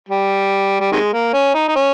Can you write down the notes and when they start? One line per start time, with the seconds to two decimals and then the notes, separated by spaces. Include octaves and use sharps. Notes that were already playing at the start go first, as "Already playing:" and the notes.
0.09 G3
0.80 G3
0.92 C3 D#3 G#3
1.13 A#3
1.33 C#4
1.54 D#4
1.68 D#4
1.76 C#4